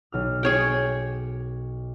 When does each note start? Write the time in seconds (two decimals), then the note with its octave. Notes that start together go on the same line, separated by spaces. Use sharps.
0.12 B1 F6
0.43 G#4 C#5 G5